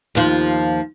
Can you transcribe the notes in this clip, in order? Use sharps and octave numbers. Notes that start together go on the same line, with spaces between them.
D#2 F3